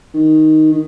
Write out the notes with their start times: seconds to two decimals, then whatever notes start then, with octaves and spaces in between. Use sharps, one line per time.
0.14 D#3
0.72 D#3